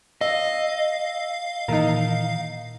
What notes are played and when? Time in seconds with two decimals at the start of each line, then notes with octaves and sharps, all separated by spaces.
0.21 D#5 F5 E6
1.68 A#2 D#3 E3 D#4 A#4